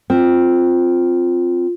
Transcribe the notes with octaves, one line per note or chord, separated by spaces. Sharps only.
C4 F4